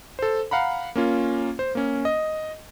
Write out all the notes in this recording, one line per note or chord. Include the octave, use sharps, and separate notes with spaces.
A4 C5
F5 F#5 A#5 B5
A#3 C#4 F4
C5
A#3 C#4
D#5